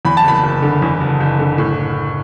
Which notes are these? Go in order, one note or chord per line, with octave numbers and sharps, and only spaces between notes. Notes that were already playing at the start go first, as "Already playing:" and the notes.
E2 B5
A5
F#1 B5
F#1
D3
E2
F#1
F#1
D3
A2